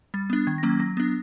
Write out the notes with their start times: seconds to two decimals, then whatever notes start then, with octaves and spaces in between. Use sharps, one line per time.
0.14 G3 A6
0.30 B3 D4
0.47 D#3 G#6
0.58 A#6
0.63 F#3 A#3 C#4
0.69 G#6
0.80 F#3 A#6
0.97 B3 D4